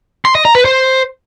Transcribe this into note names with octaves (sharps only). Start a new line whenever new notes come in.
C6
D#5
A#5
B4
C5